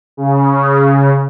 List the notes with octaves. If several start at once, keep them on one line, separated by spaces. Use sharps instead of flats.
C#3